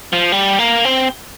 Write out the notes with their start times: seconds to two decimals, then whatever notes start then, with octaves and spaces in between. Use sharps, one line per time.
0.13 F3
0.32 G3
0.59 A#3
0.85 C4